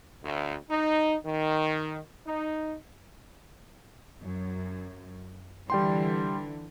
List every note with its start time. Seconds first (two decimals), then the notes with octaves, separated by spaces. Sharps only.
0.24 D2
0.71 D#4
1.25 D#3
2.27 D#4
4.22 F#2
5.70 D3 E3 G3 G5 C6